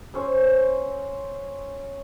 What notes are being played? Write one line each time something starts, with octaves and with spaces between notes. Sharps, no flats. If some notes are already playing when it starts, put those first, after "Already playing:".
C#4 C5 E6